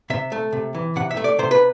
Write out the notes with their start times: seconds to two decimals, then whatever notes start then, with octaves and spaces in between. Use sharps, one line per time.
0.10 C3 E5
0.32 A3
0.52 C3
0.74 E3
0.96 C3 F#5
1.11 E5
1.17 A3
1.24 D5
1.39 C3 C5
1.51 B4